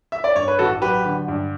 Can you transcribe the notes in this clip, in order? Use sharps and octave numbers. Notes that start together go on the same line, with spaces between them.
E5
D5
G2 C#5
B4
A1 F#4 A4
F#3 G4 B4
D3
G2